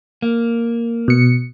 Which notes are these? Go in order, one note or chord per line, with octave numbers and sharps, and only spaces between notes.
A#3
B2 C#7